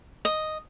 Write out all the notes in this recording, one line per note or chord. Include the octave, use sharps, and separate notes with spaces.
D#5